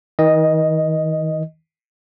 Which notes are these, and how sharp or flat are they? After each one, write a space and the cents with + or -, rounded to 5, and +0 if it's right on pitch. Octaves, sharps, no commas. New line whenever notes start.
D#3 +40 D#5 +0